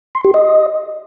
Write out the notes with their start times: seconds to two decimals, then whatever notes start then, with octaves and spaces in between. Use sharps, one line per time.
0.15 C6
0.24 G4
0.34 D#5